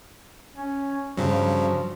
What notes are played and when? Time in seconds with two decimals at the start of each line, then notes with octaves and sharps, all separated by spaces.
0.55 C#4
1.17 G2 C#3 F3 F#3